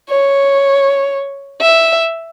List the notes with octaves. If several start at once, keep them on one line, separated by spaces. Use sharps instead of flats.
C#5
E5